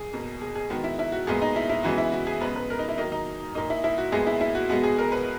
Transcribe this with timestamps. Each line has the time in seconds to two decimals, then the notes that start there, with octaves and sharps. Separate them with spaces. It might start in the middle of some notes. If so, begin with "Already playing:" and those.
Already playing: G#4
0.13 B2 A#3
0.42 G#4
0.55 G#4
0.70 D#3 G#3 B3 F#4
0.84 E4
0.99 E4
1.12 F#4
1.27 A#2 G#3 B3 G#4
1.42 D#4
1.56 E4
1.69 E4
1.83 C#3 E3 G#3 B3 F#4
1.98 E4
2.12 F#4
2.27 G#4
2.41 C#3 G#3 B3 B4
2.56 B4
2.70 A#4
2.79 D#4
2.89 E4
2.98 D#3 F#3 A#3 D#4
3.12 D#4
3.55 A#2 A#3 D#4
3.70 E4
3.84 E4
3.98 F#4
4.12 A#2 G#3 B3 G#4
4.27 E4
4.41 E4
4.55 F#4
4.69 B2 G#3 B3 F#4
4.84 G#4
4.98 A#4
5.12 B4